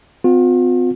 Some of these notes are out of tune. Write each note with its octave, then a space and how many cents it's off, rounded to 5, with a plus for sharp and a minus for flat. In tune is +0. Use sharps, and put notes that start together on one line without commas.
C4 -40 F4 +40